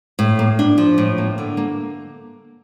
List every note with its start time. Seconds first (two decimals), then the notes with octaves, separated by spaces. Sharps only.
0.19 A2
0.39 A#3
0.59 D4
0.78 F3
0.98 A2
1.18 A#3
1.38 D3
1.57 A#3